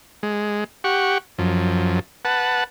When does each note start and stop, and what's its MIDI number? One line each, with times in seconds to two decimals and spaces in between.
0.23 0.64 56
0.84 1.18 67
0.84 1.18 78
0.84 1.18 85
1.38 1.99 42
1.38 1.99 53
2.25 2.64 71
2.25 2.64 78
2.25 2.64 81